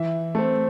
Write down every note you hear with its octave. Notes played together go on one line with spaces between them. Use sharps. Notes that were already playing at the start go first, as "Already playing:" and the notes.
Already playing: E3 E5
A3 C4